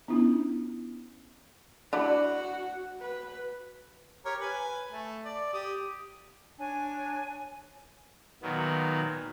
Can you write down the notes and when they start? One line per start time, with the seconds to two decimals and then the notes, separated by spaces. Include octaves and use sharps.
0.08 B3 C#4 D4 E4 F4
1.93 D4 E4 F#4 D5
3.01 B4
4.25 G4 A#4 C#5
4.41 B4 G#5
4.91 A3
5.25 D5
5.53 G4 D#6
6.59 D4 C#5 G#5
8.42 A#2 D#3 F#3 B3